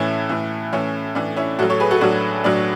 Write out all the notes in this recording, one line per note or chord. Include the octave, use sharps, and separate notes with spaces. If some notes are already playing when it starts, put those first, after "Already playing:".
Already playing: A2 E3 C#4 E4
A2 E3
A2 E3 C#4
A2 E3 D4
C#4 E4
A2 F#3 F#4 A4
A4 C#5
G#4 B4
F#4 A4
A2 F#3 D4 F#4
A2 F#3 D4